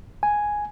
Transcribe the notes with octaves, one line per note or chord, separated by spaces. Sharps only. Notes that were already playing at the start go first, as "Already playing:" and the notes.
G#5